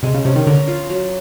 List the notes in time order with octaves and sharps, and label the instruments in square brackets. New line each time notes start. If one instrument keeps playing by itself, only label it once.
[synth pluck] C3 [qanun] G#3
[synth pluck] C#3
[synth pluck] C3 [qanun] C#4
[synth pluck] D#3
[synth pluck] D3 [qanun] A#4
[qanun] F4
F#3